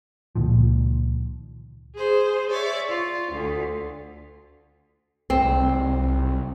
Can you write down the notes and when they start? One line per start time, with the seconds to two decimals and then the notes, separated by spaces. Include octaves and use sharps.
0.35 C#2 A#2 D#3 F3
1.95 G#4 C5
2.50 C#5 D5 E5
2.90 F4
3.33 D2
5.30 C2 C4